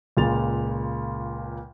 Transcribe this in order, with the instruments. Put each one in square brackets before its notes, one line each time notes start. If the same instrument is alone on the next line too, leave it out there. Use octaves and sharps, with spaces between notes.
[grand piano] C#2 A#2 G#4 A6 F7